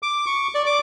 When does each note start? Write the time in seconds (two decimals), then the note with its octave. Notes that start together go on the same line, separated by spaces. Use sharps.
0.03 D6
0.26 C#6
0.55 D5
0.66 D6